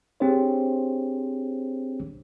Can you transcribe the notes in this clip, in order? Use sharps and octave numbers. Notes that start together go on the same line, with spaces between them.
C4 D4 G4 G#4 C5 C#5